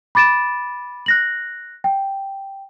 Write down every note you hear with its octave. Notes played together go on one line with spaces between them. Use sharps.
B5 D6 A6 D7 E7
F#6 A#6 F#7
G5